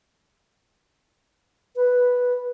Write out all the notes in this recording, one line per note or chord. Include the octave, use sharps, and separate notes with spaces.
B4